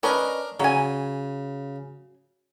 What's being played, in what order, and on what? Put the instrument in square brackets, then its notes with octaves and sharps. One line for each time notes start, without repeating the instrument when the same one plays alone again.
[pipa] C#4 B4 D#5 [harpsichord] D4 A#4
[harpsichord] C#3 [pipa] F#3 G#5